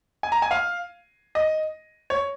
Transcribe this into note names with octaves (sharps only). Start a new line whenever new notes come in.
G#5
A#5
G#5
F5
D#5
C#5